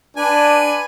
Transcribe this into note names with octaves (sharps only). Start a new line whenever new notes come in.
D4 B4 G#5